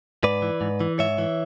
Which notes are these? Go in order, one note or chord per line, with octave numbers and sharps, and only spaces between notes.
G#2 B4 D5
E3
G#2
E3
G#2 C#5 E5
E3